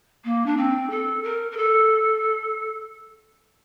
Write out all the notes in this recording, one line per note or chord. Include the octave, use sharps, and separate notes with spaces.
A#3
D4
C4
A4
A#4
A#4
A4